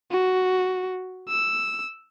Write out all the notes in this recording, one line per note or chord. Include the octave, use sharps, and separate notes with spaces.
F#4
E6